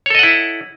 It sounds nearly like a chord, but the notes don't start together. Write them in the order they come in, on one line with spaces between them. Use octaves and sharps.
C#5 A4 D#5 F#5 E4